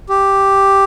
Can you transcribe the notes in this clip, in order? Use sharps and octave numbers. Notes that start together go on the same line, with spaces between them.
G4